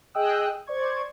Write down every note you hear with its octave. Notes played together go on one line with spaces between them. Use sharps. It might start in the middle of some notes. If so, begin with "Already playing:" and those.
G#4 D#5 G5 D#6 E6 F#6
C5 D5 C#6 G#6